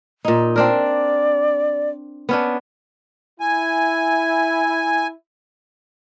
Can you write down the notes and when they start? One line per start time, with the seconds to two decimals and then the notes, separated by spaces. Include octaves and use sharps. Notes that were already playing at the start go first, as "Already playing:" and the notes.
0.25 A#2 D#4
0.56 C4 D4 A#4 D5
2.29 B3 C#4 D4
3.40 E4 G#5